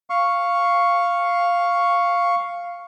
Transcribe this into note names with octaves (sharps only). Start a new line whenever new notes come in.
F5 C#6